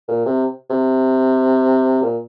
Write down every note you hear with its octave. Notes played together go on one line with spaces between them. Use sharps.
A#2
C3
C3
A#2